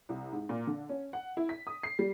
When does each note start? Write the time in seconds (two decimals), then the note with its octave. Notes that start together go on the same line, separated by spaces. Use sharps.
0.09 C2
0.32 G#2
0.49 A#2
0.67 D3
0.89 C#4
1.13 F#5
1.37 E4
1.49 B6
1.67 D#6
1.83 C7
1.99 G3